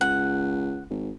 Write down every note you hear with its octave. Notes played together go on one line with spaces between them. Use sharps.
C#2 F#5
G#1